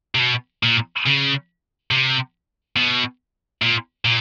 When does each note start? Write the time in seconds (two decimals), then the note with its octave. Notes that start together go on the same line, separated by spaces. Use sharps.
0.15 C3
0.19 B2
0.63 A#2
1.06 C#3
1.91 C3
2.77 B2
3.62 A#2
4.05 A#2